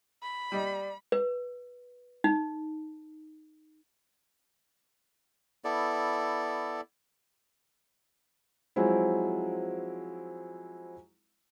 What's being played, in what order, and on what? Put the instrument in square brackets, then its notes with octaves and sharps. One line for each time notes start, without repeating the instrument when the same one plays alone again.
[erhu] B5
[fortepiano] G3 D#5 [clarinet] D5
[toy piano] B4
D#4
[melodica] B3 E4 A4 D5
[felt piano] F3 F#3 G#3 C4 E4